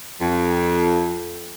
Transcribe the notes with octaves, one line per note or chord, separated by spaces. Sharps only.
F2